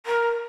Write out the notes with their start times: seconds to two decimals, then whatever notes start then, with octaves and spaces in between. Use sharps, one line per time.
0.06 A#4